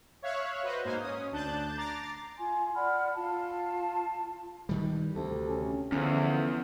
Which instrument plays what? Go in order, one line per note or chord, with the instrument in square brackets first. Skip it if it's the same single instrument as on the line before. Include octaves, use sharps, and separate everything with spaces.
[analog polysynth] C#5 E5 F5 C#6 F#6
F#4 B4 C5 D#5
G#2 A#3 D#4 C5 F5 G#5
C#4 D#6
D2 D4 A5 F#6 G6 A6
A#5 D6 A6 C7
[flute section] F4 G#5 C6
D5 F#5 B5 F6
F4 A5
[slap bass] G2 D#3 G3
[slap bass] D2 [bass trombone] C3 [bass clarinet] A4
[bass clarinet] C#4
[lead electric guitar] E2 [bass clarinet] D3 [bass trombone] F3 [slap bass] C#4